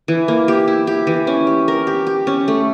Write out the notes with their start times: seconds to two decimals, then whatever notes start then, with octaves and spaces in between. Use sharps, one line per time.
0.08 E3
0.28 A#3
0.48 G4
0.68 E4
0.87 G4
1.07 E3
1.27 C#4
1.47 G4
1.68 A#4
1.87 G4
2.07 G4
2.27 C#4
2.48 A3